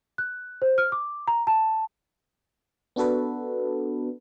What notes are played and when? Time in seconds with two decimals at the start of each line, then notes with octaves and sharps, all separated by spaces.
0.18 F#6
0.62 C5
0.78 F6
0.92 D6
1.28 A#5
1.47 A5
2.96 B3 D4 F#4 A4 B4